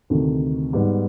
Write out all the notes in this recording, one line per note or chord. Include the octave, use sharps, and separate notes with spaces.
D2 C3 D#3
G#2 G3 B3